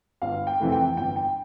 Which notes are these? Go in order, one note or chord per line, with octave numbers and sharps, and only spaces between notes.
G1 F5
G5
F2 C3 E3 A3
G5
G1 G5
G5